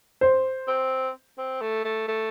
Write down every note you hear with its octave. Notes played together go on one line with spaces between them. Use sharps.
C5
C4
C4
A3
A3
A3